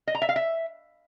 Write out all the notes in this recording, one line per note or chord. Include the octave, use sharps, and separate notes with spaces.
D#5
A#5
E5
F5
E5